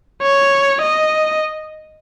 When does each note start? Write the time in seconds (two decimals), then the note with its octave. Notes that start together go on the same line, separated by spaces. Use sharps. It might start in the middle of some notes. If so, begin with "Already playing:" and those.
0.22 C#5
0.82 D#5